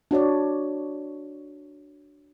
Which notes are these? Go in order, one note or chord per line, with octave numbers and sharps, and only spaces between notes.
D4 F#4 C#5 D5